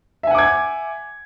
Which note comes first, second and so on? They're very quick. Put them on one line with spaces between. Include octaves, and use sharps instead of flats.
E5 G#5 F#5 D6 G#6